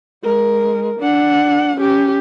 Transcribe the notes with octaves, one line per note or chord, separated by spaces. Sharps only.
G#3 A#4
D4 F#5
C#4 G4